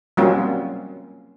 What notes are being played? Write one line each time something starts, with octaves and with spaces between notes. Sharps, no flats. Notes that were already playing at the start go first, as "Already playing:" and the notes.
F#3 G3 A#3 C4 C#4 F4